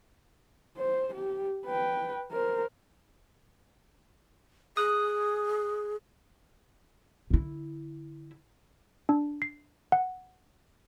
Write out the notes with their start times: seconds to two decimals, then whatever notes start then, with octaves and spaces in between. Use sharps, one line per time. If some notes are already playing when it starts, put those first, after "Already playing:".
0.77 C5
1.14 G4
1.65 B4 G5
2.32 A#4 C5
4.77 G#4 D#6 F#6
7.30 D3 E4
9.09 D4
9.42 C7
9.92 F#5